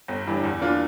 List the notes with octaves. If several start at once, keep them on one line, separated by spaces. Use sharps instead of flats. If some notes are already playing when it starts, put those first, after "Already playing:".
G1
G2 E3
E2
E3 A#3 D4 F4